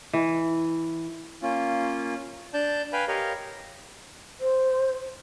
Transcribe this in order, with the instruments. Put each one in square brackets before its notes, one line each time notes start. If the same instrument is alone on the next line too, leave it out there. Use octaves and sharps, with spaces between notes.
[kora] E3
[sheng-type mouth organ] A#3 C#4 F4
D4 D5 A5 G6
B4 F5 G5 G#5 B5
G4 A#4 C#5 D#5 F5
[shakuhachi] C5